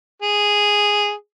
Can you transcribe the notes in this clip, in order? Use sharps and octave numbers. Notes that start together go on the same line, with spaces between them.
G#4